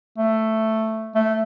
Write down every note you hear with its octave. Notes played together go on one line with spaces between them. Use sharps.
A3
A3